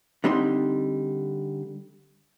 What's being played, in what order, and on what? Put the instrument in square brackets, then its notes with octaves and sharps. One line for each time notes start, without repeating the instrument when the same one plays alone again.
[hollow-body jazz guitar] D3 G3 C4 D#4 C6